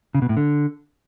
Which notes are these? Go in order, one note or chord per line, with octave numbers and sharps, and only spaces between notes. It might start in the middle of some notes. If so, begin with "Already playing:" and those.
C#3
B2
A2
D3